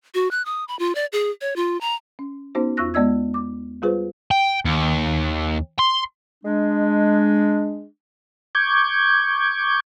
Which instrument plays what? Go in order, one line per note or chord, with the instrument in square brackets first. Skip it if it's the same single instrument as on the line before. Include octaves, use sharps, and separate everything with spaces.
[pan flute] F#4
F#6
D#6
B5
F4
D5
G#4
C#5
F4
A#5
[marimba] C#4
B3 C#4 D#4 F#4 C5
E2 F4 C#6 E6 F#6 A#6
G#3 B3 D5 D#5 E6 G#6
D6
G3 F4 G#4 B4 C5
[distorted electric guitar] G5
D#2
C6
[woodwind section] G#3 D4
[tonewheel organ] C#6 D6 G6 G#6